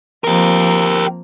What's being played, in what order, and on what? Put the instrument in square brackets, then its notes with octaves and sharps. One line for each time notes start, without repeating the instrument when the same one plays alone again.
[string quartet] F3 A#3 C4 [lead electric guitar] G4 A#4